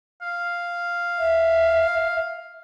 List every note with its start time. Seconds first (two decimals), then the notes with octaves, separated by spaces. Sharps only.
0.22 F5
1.19 E5